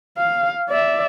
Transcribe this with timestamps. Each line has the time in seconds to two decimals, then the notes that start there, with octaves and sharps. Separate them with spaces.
0.18 F5
0.69 D5 E5